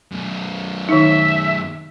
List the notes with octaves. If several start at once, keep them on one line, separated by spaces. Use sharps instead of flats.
F#2 B2
D#3 D#4 E5